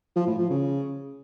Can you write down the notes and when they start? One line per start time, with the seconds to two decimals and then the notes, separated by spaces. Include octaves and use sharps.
0.16 F3
0.27 A2
0.38 F3
0.50 C#3